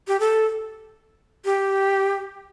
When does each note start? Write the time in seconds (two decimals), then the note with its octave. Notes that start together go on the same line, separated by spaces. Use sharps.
0.08 G4
0.20 A4
1.45 G4